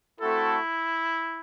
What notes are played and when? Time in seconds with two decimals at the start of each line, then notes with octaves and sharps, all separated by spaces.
0.20 A3 C4 E4 F#4 A4